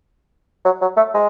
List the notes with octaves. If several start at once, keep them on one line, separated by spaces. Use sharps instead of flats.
F#3
F#3
A3
G#3